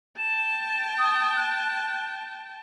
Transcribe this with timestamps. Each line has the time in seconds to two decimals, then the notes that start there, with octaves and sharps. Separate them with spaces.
0.18 G5 A5 E7
0.99 D#6
1.36 F#6